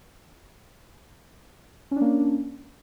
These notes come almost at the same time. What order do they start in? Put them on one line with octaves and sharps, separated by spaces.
C#4 D4 A#3